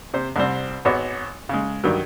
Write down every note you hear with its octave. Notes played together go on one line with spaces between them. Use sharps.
C3 C5
C2 G3 C4
G#1 B3 F#4 C#5 D6
C#3 G#3
G2 D#3 F#3